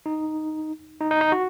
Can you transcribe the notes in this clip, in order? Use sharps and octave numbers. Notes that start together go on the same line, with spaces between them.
D#4
D#4
D#4
D#4
F#4